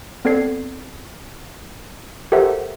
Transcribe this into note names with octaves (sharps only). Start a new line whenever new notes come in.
B3 C4 A4 D5 G#6 C7
G4 A4 A#4 C5 E5 F#5